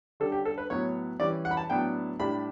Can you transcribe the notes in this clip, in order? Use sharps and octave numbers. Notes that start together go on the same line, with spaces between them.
D3 G3 C#4 A4
G4
A4
B4
A2 F#3 B3 C#5
E3 G3 C#4 D5
F#5
B5
A5
A2 F#3 B3 D4 G5
A2 G3 D4 B5